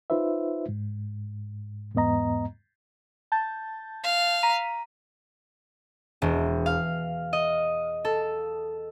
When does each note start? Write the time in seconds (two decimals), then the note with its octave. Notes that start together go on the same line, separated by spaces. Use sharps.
0.10 D#4 F4 B4 C5 E5
0.69 G#2
1.95 E2 G#2 B3 D#5 A#5
3.32 A5 G6 A6
4.04 F5
4.43 A#5 B6 D#7
6.22 E1
6.66 F5
7.33 D#5
8.05 A4